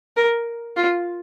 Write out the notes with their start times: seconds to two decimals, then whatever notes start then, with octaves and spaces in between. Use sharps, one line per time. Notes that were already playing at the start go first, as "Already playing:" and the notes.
0.17 A#4
0.76 F4